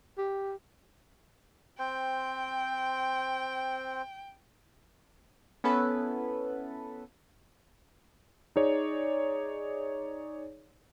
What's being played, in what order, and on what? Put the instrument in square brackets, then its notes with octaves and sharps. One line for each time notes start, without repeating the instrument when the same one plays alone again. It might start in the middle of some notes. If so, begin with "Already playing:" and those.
[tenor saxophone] G4
[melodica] C4 C5 [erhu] G5
[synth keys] B3 C#4 E4 A4 B4
[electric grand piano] D#4 G#4 C#5 D5